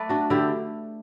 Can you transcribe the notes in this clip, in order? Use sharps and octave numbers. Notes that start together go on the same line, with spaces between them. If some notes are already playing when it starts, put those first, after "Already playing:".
Already playing: A3 B4 D5
D4 F#4
D3 E4 G4